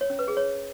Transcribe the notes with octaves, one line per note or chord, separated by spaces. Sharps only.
C#5
C#4
B4
G#4
C#5